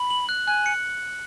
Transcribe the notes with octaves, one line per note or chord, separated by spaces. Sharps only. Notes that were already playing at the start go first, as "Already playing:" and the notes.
Already playing: B5
F#7
F#6
G#5 F#6
C#7